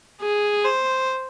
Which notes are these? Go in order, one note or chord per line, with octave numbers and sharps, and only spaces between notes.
G#4
C5